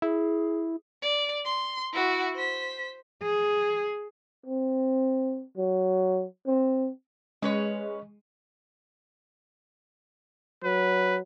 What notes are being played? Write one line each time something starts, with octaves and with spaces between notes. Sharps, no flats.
E4 G#4
D5
C6
E4 F#4
C5 B6
G#4
C4
F#3
C4
G#3 C#4 B4 C#5 D#5
F#3 B4